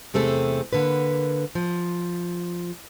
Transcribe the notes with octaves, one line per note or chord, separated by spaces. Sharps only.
E2 C3 A3 C4 G#4 A4
D3 A#3 B4
F3